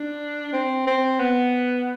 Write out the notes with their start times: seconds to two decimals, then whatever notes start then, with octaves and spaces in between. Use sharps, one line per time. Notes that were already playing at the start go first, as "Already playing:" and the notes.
Already playing: D4
0.53 C4
0.87 C4
1.20 B3